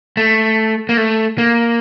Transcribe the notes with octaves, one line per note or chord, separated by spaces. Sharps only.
A3
A#3
A3
A#3